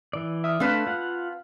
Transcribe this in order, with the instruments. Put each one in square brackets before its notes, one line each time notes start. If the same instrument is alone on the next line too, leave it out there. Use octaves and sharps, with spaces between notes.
[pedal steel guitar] E3 D5
[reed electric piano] E5 D#6 F6
[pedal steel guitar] A3 D4 A4 [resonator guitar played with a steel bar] C4 B4 A5 [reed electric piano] F5 F6
[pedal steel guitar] F4 F#5